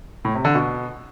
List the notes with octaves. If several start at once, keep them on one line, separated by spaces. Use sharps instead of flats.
A2
C3
D3
B2